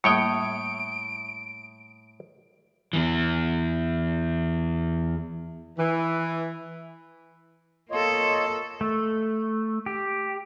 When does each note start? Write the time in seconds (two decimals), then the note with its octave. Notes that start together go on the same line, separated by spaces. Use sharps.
0.04 A2 G3 A#3 C#5 G5 D#6 C#7 D7
2.93 E2 E3
5.78 E3
7.91 A#3 F4 A4 C#5 D#5
8.81 A3
9.86 G4